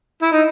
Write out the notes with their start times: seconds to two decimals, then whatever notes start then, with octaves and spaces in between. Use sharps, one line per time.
0.23 E4
0.32 D#4